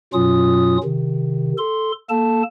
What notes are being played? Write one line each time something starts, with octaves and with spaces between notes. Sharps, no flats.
F#2 B2 F#3 C#4 F4 D#6
C3 D#3
A4 C6
A#3 A4 A5